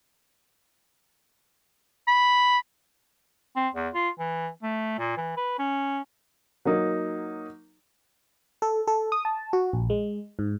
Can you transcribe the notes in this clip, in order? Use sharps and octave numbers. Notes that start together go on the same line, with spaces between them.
B5
C4
E2
F4
E3
A3
A#2
E3
B4
C#4
F#3 A#3 D#4
A4
A4
D#6
A5
F#4
A#1
G#3
G#2